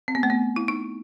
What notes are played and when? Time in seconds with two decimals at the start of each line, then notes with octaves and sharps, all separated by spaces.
0.08 C4
0.15 B3
0.23 A3
0.30 B3
0.56 E4
0.68 D#4